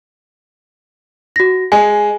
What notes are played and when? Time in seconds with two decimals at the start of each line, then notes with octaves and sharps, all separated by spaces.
1.36 F#4 A#6
1.72 G#3 G#5